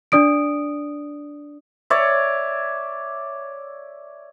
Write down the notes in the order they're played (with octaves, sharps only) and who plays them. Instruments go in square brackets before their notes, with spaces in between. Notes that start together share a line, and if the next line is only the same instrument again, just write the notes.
[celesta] D4 D5 D#6 D7
[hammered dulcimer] C#5 D5 E5